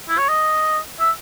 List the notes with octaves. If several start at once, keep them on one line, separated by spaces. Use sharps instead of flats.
E4
C#5
D#5
E5